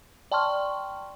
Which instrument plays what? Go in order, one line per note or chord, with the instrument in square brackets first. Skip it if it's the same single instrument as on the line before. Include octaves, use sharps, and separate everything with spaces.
[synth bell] D5 G5 A5 C6 C#6 F6